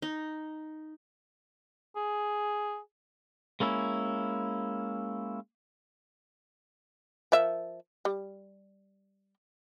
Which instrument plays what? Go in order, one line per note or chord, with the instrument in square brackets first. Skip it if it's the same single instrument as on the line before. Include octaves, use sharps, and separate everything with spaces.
[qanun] D#4
[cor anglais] G#4
[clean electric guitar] G#3 A#3 C#4 E4
[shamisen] F3 A#4 E5
G3